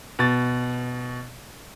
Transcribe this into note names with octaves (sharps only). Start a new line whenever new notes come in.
B2 A6